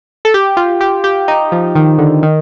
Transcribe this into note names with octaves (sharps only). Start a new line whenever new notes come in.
A4
G4
F4
G4
G4
D#4
F3
D#3
D3
D#3